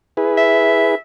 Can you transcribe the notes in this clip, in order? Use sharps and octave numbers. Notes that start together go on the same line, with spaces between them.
E4 G#4 B4
E5